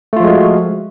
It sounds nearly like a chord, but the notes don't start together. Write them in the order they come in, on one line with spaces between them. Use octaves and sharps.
A3 F4 F3 G#3 F#4